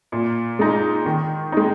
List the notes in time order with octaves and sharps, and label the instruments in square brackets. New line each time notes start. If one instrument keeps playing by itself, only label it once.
[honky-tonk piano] A#2
G#3 D#4
D#3
G#3 D#4